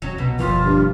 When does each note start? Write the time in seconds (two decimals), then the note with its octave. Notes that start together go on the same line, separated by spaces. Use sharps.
0.02 D#1 F#3 C#4
0.18 C2 B2
0.39 F#1 D#2 B2 E3 F3 F4
0.65 G2